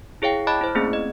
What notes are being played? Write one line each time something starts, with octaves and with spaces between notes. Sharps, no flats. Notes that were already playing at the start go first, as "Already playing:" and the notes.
E4 G#4 C#5 F5 G5
D#5 A5 B5 D6 F#6 A6
E4 C5
A3 A#3 C4 C#4 G#4
D#5